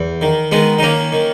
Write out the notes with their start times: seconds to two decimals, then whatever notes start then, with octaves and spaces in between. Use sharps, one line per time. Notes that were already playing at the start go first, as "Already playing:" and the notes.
Already playing: E2
0.21 D#3
0.51 D#3 G#3 B3
0.78 D#4
0.82 D#3 A#3 C#4
1.12 D#3